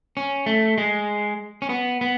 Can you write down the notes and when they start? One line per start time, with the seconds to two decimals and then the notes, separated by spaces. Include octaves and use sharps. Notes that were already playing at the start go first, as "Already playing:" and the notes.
0.17 C#4
0.46 A3
0.78 G#3
1.62 C#4
1.69 B3
2.01 B3